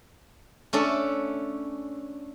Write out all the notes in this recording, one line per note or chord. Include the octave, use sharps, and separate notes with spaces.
A3 C#4 D4 A4